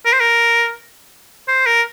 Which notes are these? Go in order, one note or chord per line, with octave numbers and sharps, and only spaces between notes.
A#4
C5
A#4
C5
A#4